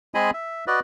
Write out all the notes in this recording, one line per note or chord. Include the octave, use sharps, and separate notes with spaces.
G#3 C4 G#4 D#5 G#5 B5
E5
F#4 B4 D5 D#5